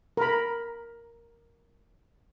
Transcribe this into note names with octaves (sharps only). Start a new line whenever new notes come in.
A#4 B5